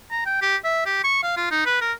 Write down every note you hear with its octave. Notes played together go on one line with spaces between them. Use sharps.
A#5
G5
G4
E5
G4
C#6
F5
F4
D#4
B4
A#4